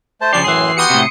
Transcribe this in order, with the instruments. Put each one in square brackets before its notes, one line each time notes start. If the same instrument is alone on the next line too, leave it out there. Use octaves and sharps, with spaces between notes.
[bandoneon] A3 C5 A5
[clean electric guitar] C#3 F3 G4 [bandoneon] D4 D5 [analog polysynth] C7
[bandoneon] F#2 A2 C6 [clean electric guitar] E3 G#4
[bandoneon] B3 F#4 G4 [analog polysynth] C6 D#6 C#7
[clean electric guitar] A2 C3